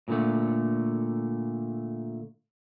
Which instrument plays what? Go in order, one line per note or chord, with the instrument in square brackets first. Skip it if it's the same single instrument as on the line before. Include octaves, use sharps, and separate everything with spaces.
[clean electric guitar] A#2 D3 A3